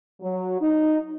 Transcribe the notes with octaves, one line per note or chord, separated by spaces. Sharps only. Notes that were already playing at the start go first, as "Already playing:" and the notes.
F#3
D#4